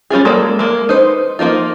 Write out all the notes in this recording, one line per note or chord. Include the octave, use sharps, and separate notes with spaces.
G3 C#4 F4 G#4
G#3 A#3 A4 D5
G#3 A#3
D#4 B4 C5
F3 A#3 D#4 F4